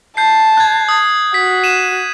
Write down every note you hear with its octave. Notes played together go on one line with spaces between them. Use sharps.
A5 G6 C7
F#6 G#6
D#6 G#6
F#4 B6
D#7 E7